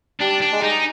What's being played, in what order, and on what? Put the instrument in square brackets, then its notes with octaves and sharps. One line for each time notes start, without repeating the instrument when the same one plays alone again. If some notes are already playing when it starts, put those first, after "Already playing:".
[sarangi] G3 [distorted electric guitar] D4
[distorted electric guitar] D4
[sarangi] G#3
[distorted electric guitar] D#4